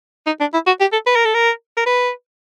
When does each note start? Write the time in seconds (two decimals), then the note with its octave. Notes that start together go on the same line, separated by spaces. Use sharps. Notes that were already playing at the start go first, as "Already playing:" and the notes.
0.27 D#4
0.40 D4
0.54 E4
0.67 F#4
0.81 G4
0.93 A4
1.07 B4
1.16 A#4
1.25 A4
1.34 A#4
1.77 A#4
1.86 B4